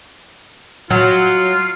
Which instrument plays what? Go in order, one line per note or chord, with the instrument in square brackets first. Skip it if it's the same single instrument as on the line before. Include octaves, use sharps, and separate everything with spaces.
[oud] F#3 [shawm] F4